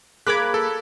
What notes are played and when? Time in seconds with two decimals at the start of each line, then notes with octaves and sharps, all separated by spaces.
0.27 A#3 G#4 A#4 B5 D6 F#6 G#6 B6
0.54 A4